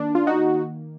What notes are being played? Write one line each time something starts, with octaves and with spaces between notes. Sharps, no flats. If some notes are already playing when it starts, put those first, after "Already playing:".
Already playing: D#3 A#3 D4
F4
D#4 F#4